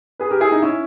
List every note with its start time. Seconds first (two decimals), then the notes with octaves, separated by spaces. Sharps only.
0.19 G#4 B4
0.30 G4 A#4
0.40 E4 G#4
0.52 D#4
0.62 C#4 E4